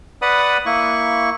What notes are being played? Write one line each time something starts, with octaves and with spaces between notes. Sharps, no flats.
B4 D5 F#5 B5 D#6
A#3 E4 C#6